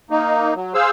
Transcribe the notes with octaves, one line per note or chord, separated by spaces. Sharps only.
A#3 D#4
F#3
G#4 C5 F5 E6